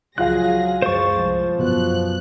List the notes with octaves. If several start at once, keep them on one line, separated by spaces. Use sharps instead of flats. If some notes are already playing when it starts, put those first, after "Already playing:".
C#2 F3 F#3 F4 G#4 F5 F#6 A#6
F#2 G#3 C5 C#6 A6
C2 F3
F#2 B2 F#6